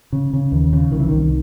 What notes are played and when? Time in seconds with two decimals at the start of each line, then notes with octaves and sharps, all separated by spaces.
0.13 C#3
0.33 C#3
0.52 D#2
0.73 C#3
0.92 C2 D#3
1.00 E3
1.08 C2 D#3